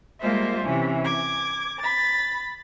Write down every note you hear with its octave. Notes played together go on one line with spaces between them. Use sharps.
G3 G#3 A#3 F4 C5 E5
C3 E3 C#4
D6 G#6
B5 A6